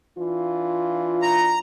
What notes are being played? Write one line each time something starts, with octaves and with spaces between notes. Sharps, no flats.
E3 D4 F4
A#5